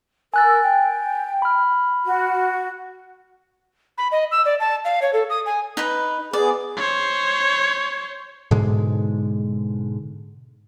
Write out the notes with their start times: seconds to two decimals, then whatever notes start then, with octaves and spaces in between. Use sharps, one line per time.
0.34 A#4 G#5 E6 F#6 A6
0.63 G5
1.42 B5 F6
2.06 F#4
3.98 B5
4.12 D#5
4.31 E6
4.45 D5
4.60 A5
4.85 F5
5.02 C#5
5.13 A4
5.30 D#6
5.46 G#5
5.77 D#4 B4 B5
6.33 B3 G#4 D5
6.77 C5 C#5
8.51 G#2 B2 D3 G#3